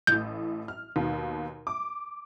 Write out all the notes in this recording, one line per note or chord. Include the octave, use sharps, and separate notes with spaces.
A1 A2 G6
F6
D#2 B2
D6